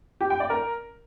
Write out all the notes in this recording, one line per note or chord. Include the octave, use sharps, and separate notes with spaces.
G4
G5
D5
A#4